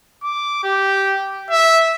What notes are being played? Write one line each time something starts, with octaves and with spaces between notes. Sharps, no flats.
D6
G4
E5